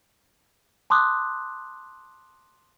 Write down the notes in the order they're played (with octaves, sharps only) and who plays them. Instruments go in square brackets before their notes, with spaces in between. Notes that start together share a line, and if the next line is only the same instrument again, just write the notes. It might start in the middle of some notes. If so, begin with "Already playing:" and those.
[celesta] A5 C6 D6 D#6 F#6